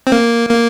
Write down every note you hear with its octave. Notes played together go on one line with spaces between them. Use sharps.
C4
A#3
A#3